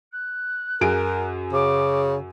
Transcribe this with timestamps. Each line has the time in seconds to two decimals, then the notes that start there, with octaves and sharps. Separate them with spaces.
0.12 F#6
0.81 F#2 G#4 A#4 D7
1.53 C#3 D6